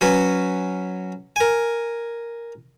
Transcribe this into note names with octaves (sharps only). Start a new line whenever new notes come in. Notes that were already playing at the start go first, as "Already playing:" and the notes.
F#3 C#4 F#4 B4
A#4 G#5